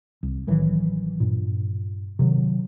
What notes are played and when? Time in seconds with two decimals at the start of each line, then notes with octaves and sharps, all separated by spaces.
0.23 C2
0.47 A1 D#3 E3 F#3
1.20 G2 A#2
2.19 C3 D#3 F#3